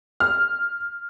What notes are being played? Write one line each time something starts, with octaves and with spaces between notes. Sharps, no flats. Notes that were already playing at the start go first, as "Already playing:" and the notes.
F6